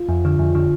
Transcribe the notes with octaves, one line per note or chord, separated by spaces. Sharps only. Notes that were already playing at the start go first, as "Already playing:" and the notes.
Already playing: F4
F2
D3
F2
D3